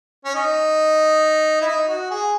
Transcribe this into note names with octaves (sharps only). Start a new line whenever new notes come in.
C#4
D#4
E4
D#4
F#4
G#4